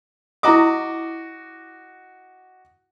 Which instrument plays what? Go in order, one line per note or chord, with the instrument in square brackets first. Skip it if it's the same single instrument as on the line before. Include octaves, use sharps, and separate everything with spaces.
[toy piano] E4 A#5 D#6 [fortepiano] F#4 D#5 D6